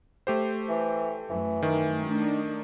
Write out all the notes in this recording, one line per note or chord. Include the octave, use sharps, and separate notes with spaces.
A3 G4 C5
E3
F#2 E3 A3
D#3
A3 D4 D#4